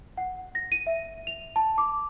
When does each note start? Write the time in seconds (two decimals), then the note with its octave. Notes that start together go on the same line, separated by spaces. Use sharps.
0.17 F#5
0.55 A#6
0.72 D#7
0.87 E5
1.27 F7
1.56 A5
1.78 D6